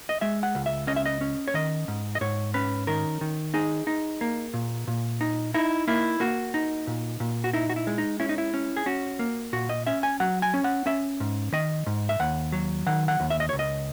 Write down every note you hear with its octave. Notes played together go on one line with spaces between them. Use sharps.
D#5
G#3 E5
F#5
C#2
E5
C#4 D#5
E5
D#5
C#4
C#5
D#3 D#5
G#2
D#5
G#2 C#5
C#4 B4
D#3 A#4
D#3
D#4 G#4
D#4
A#3
A#2
A#2
D#4
D#4 E4
A#3 E4
A#3 F#4
D#4
A#2
A#2
F#4
D#4 E4
F#4
E4
G#3
D#4
C#4 E4
D#4
E4
C#4
G#4
C#4 F#4
A#3
A#2 F#4
D#5
C#4 E5
G#5
F#3 F#5
G#5
C#4
F#5
C#4 E5
G#2
D#3 D#5
G#2
E5
D#2 F#5
F#3
D#3 F#5
F#5
D#2
E5
D#5
C#2 C#5
D#5